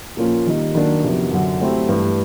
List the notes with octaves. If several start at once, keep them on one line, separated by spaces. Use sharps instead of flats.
A#2 F3 A#3 C#4 F4
D#3 G3 A#3 D#4
D#3 F#3 A#3 D4
F2 C3 D#3 F#3 B3
F#2 D3 F#3
F#3 A3 C4 E4 G4
G2 E3 A3